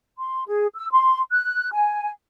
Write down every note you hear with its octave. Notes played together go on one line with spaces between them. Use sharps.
C6
G#4
E6
C6
F#6
G#5